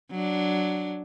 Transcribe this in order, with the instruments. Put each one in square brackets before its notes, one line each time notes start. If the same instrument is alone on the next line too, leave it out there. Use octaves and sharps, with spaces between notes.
[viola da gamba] F#3 D4